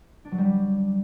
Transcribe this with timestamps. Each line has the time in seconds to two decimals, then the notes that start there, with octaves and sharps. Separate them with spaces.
0.25 D4
0.31 F#3
0.38 G3